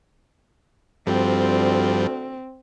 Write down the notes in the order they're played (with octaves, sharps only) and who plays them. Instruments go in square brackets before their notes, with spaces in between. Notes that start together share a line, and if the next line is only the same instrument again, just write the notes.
[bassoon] D2 [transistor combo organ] G2 F3 G3 [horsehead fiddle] C4